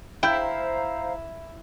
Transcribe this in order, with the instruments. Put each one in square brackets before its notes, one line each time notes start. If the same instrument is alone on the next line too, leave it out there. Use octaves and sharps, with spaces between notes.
[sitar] E4 [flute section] C5 F5 A#5 [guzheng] G5